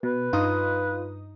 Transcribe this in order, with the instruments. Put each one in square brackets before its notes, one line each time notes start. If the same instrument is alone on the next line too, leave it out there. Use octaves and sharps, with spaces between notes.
[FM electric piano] B2 [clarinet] B4
[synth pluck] G2 D#4 D#6 [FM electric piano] F4